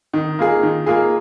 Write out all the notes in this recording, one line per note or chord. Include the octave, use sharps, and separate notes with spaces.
D#3
A#3 F4 G#4
D#3
A#3 F4 G#4